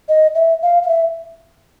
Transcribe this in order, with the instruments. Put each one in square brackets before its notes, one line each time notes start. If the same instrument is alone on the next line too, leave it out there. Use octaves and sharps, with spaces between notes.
[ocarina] D#5
E5
F5
F5
E5